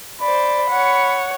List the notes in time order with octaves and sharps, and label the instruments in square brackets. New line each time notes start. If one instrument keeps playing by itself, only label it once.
[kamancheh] C5 D5 [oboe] B5
[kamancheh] C#5 F#5